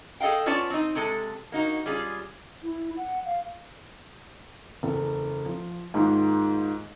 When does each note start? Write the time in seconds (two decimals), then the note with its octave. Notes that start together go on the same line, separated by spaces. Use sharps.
0.20 G#4 A4 D#5 F5 G5
0.46 B3 C#4 F4 C#5 D5 A5
0.70 C4 D#4
0.95 C3 G#3 A4
1.52 A#3 D#4 F#4
1.85 G3 C#4 F4 G#4
2.63 E4
2.97 F#5
3.25 F5
4.83 F#1 E2 A4
5.46 F3
5.94 G#2 D#3 G#3 A#3 F4